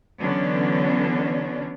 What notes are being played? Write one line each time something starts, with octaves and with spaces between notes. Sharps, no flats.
D3 E3 F#3 B3 C#4 D4